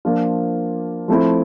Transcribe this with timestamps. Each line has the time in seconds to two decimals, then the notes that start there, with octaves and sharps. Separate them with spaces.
0.05 F3 A#3 D4 F4
1.08 F3 A3 C4 E4